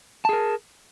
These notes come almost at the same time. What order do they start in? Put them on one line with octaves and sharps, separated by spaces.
A5 G#4 A#4